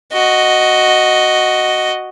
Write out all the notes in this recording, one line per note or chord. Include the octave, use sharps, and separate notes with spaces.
F#4 D#5